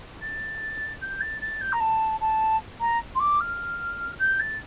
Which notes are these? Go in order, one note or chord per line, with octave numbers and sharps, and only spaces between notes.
A6
G6
A6
A6
G6
A#5
A5
A5
A#5
C6
D6
F6
G6
A6